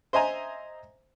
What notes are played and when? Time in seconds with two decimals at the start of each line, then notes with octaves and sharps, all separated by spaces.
0.13 C5 D#5 E5 G#5 A#5